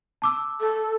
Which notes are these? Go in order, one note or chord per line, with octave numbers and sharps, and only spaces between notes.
A5 D6 E6
A4